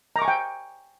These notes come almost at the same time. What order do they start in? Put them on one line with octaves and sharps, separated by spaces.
A#5 D6 C#6 G#5 G5